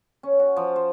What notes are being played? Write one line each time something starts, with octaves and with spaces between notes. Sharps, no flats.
C#4
F#4
F3
C5